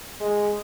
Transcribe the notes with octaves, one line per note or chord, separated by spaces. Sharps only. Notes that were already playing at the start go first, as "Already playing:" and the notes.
G#3